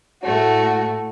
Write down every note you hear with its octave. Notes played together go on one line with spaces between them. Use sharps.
A2 A3 F#4